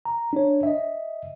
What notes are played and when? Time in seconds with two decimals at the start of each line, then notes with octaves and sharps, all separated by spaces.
0.05 A#5
0.33 D4 C#5
0.63 D#5 E5